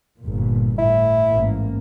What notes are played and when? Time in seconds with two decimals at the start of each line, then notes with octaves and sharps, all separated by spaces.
0.21 G1 A#2
0.78 A2 E4
1.30 A1 G#2 A#3